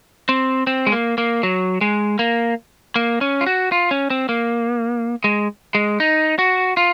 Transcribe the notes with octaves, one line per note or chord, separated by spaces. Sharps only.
C4
C4
G#3
A#3
A#3
F#3
G#3
A#3
A#3
C#4
F4
F#4
F4
C#4
C4
A#3
G#3
G#3
D#4
F#4
F4